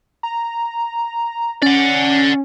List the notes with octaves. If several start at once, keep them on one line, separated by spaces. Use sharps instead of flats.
A#5
C#4 D5 F#5